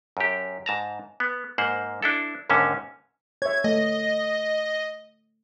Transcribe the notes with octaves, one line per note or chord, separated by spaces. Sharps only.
F#2 G4
G#2 A5 A#5
B3
G#2 A#3 C5 F#5
D4 E4 A4
D#2 G#2 D3 C#4 E5
C#5 E5 G#6
A3 D#5